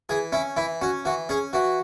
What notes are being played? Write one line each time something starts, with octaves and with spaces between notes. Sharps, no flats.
E3 G#4
C#4 E4
E3 E4
C#4 F#4
E3 F#4
C#4 G#4
E3 F#4